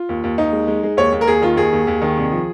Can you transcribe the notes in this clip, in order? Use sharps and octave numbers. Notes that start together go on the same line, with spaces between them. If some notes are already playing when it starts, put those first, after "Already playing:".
Already playing: F4
D#2
D#2
D#2 D#4
G#3
G#3
G#3
D#2 C#5
D#2
A#4
D#2 G#4
D#3 F4
D#2 G#4
D#2
D#2
D#3
C2
F3